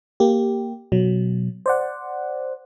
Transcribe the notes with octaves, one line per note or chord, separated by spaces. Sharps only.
A#3 G4
B2 F#3
C5 D5 F#5